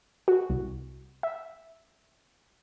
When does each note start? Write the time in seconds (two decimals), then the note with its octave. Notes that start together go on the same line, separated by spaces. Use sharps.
0.28 F#4
0.49 C2
1.23 E5